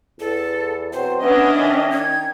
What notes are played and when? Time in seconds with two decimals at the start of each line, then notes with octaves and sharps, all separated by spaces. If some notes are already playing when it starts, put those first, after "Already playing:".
0.19 E2 A4
0.93 B2 F#3 C4 C5
1.21 B3 C#4 D4 D#5 E5
1.54 D#3
1.91 G#6